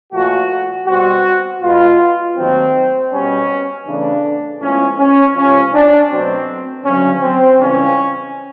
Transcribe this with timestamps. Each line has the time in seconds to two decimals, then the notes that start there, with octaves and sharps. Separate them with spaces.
0.12 A#2 F3 A3 F#4
0.86 B2 G3 C4 F#4
1.61 B2 G#3 B3 F4
2.36 D#2 D#3 F#3 A3 C4
3.11 B2 G3 B3 C#4
3.86 E2 C#3 E3 A3 D4
4.60 A2 F3 G#3 B3 C#4
4.98 C#4
5.36 C#2 C3 F3 C#4
5.73 D4
6.10 B2 F#3 A3 C4
6.84 D2 C#3 F#3 C#4
7.22 C4
7.59 C#2 C#3 E3 G3 C#4